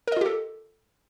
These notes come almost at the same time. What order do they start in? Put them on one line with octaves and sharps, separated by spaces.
A#4 D#5 F4 G4 A4